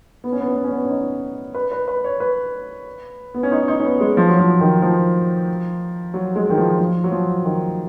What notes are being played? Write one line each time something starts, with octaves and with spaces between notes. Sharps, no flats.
B3
C#4
B3
C#4
B3
C#4
B3
C#4
D#4
B4
B4
B4
C#5
B4
B3
C#4
D#4
D#4
C#4
B3
G#3
F3
F#3
F3
D#3
F3
F#3
G#3
D#3
F3
F3
F#3
F3
D#3